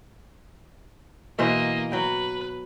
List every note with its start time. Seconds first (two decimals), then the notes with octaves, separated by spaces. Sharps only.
1.39 B2 E3 A#3 C5 D#5
1.92 F#3 B4 G5